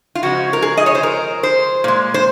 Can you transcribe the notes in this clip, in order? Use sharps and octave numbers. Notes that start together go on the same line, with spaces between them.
F4
C#3 F3 G#3 F#4
A#4
G#4
D#5
C#5
C5
A#4
C5
A#2 G#3
C5